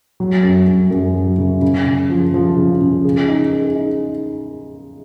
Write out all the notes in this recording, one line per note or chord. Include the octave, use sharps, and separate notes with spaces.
F#3
F#2
F#2
F#2
F#3
C#3
C#3
C#3
F3
F3
C#3
C#3
G#4
D#4
G#4
D#4